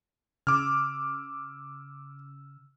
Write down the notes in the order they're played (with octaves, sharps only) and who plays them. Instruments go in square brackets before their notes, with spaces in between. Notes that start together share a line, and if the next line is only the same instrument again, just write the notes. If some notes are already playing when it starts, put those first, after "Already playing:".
[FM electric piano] C#3 E6 [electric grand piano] D6 F6